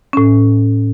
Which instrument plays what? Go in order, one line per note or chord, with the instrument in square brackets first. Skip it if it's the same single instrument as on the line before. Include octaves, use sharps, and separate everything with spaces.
[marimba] A2 C#4